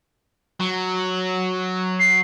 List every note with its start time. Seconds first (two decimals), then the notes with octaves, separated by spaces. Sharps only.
0.60 F#3
2.00 C7